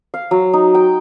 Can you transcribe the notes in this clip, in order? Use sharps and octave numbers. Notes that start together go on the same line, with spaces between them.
F5
F#3
D#4
G5